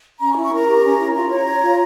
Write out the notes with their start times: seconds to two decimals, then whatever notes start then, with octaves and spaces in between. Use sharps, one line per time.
0.20 C#4 A#5
0.32 C#6
0.36 E4
0.44 C#6
0.52 A#4 A#5
0.67 G4
0.83 C#4
0.99 E4
1.15 F4 A#5
1.31 C#5
1.47 C#5
1.62 F4